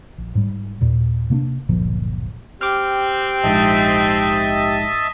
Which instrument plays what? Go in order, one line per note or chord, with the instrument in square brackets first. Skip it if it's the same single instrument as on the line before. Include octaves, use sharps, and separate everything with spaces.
[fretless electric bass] A#1
G#2 G3
D#2 A#2
C3 A#3 B3 D4
D1 G1 A#2 F3
[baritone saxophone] C4 [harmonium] G4 [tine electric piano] D6 F6
[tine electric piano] A#1 G#2 [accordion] D#5 E5 A5